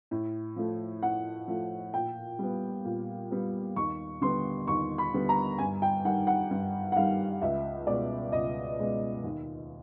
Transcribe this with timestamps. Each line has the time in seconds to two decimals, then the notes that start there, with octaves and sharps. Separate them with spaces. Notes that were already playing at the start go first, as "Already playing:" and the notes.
0.11 A2
0.56 F3 A3
1.02 A2 F#5
1.48 F3 A3
1.94 A#2 G5
2.39 G3 B3
2.85 A#2
3.31 G3 B3
3.76 D#2 C#6
4.21 D3 G3 B3 C6
4.67 D#2 C#6
4.98 B5
5.14 D3 G3 B3
5.29 A#5
5.58 G2 G#5
5.82 G5
6.05 D#3 G3 F#5
6.27 F#5
6.51 G2
6.92 F#5
6.96 D#3 G3 F5
7.42 C#2 E5
7.87 B2 G#3 D5
8.32 C#2 D#5
8.79 B2 G#3
9.24 D#2